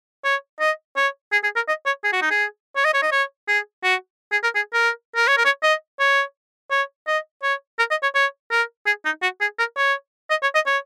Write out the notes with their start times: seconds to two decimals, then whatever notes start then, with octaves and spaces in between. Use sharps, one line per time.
0.24 C#5
0.60 D#5
0.97 C#5
1.32 G#4
1.44 G#4
1.56 A#4
1.68 D#5
1.86 C#5
2.04 G#4
2.13 F#4
2.22 D#4
2.31 G#4
2.76 C#5
2.85 D#5
2.94 C#5
3.02 D#5
3.12 C#5
3.48 G#4
3.84 F#4
4.32 G#4
4.44 A#4
4.55 G#4
4.73 A#4
5.16 A#4
5.27 C#5
5.38 A#4
5.45 C#5
5.63 D#5
6.00 C#5
6.71 C#5
7.07 D#5
7.43 C#5
7.79 A#4
7.91 D#5
8.03 C#5
8.15 C#5
8.51 A#4
8.86 G#4
9.05 D#4
9.23 F#4
9.41 G#4
9.59 A#4
9.77 C#5
10.31 D#5
10.43 C#5
10.55 D#5
10.67 C#5